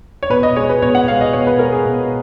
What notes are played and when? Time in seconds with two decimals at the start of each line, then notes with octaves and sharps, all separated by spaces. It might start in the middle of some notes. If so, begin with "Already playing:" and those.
0.23 C#5
0.30 B2 B4
0.43 D#5
0.56 G#3 C#5
0.60 B3
0.69 B4
0.82 B2 C#5
0.95 F#5
1.07 B3 F5
1.12 G#3
1.21 D#5
1.33 B2 C#5
1.47 B4
1.59 G#3 B3 A#4
1.72 G#4
1.85 B2